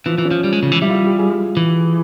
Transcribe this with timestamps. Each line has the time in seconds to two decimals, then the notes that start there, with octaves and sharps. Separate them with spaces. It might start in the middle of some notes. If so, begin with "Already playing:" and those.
0.06 E3 F3
0.18 E3
0.25 C#4
0.31 F3
0.44 G3
0.53 G#3
0.63 C#3
0.72 E3
0.82 G3 E4
0.90 F4
0.94 G4
1.06 G4
1.19 G#4
1.57 E3